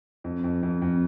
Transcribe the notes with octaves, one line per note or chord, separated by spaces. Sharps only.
F2
F2
F2
F2